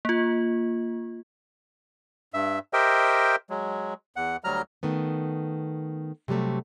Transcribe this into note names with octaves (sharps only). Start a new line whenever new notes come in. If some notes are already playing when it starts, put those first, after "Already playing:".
A#3 F4
G2 E5
G4 A#4 C5 D#5 E5 G5
F#3 G#3
E2 F#5
D2 F#3 G3 A#5 F6
D#3 A3 B3
C3 F#3 G3 A3